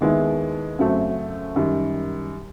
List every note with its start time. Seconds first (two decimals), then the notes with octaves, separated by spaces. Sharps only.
0.01 D#2 D#3 G#3 B3 E4
0.79 F#2 C#3 F#3 A3 C4
1.56 F#2 D#3 G3